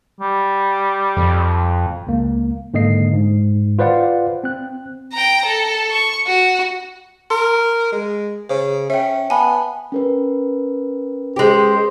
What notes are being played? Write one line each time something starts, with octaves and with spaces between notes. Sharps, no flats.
G3
F2
C#2 A#3
G#2 D3 A#3 D#5 C7
G#2
F4 B4 C5 D5 F5 F#5
C4 F#6
G5 A#5
A4
C#6
F#4
A#4 C6
G#3
C#3 C5
C#4 E5 G5
B3 G#5 A5 B5
C#4 A#4 B4
G#3 G4 C5